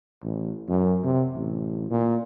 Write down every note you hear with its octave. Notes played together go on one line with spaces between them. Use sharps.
A1
F#2
C3
A1
A#2